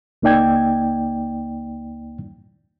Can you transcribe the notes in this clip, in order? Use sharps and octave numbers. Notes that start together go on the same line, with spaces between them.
C#2 A#3 D#4 D5 G5 G#6